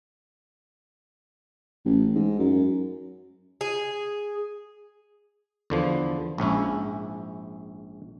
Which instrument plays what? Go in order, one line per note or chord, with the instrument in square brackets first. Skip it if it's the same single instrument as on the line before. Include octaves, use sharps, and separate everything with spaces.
[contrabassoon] A1
G#2
F#2
[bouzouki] G#4
[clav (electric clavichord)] E2 D3 F3
A#1 G#2 C#4 E4